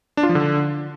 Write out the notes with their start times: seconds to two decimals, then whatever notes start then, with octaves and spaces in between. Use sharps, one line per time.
0.17 D4
0.23 F4
0.29 F3
0.35 D3